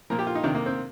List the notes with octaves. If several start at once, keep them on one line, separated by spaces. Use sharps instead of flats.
A#2 F3 A#4
G4
F4
D#4
C3 D#3 D4
A#3
C4